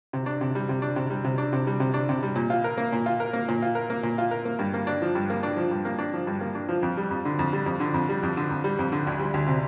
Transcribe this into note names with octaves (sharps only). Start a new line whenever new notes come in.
C3
D4
C3
G3
C3
D4
C3
G3
C3
D4
C3
G3
C3
D4
C3
G3
A#2
F4
A#4
A#3
A#2
F4
A#4
A#3
A#2
F4
A#4
A#3
A#2
F4
A#4
A#3
G2
A#3
D4
F3
G2
A#3
D4
F3
G2
A#3
D4
F3
G2
A#3
D4
F3
F2
G3
F2
D3
F2
G3
F2
D3
F2
G3
F2
D3
F2
G3
F2
D3
D2
G3
D2
C3